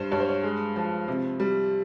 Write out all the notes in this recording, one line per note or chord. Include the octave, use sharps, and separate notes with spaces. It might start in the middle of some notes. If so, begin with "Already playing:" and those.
Already playing: G2 G3 C5
G2 C#5
C5
C#5
G#3
F3
C3
G3